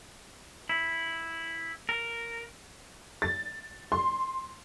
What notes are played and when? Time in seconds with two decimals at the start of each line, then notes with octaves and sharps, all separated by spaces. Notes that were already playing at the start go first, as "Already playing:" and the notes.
0.69 E4
1.89 A#4
3.22 A6
3.92 C6